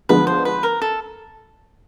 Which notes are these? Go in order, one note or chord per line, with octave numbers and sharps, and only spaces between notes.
D3 F3 G#3 B3 B4
C5
B4
A#4
A4